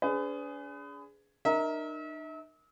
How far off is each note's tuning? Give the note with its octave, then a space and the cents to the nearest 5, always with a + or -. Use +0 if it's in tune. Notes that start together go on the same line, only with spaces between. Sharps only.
D4 -40 G#4 +0 B4 +35
D#4 -45 A#4 +0 E5 -40